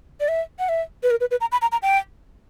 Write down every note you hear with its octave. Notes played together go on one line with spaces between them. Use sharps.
D5
E5
F#5
E5
B4
A#4
B4
B4
A#5
B5
A#5
A#5
G5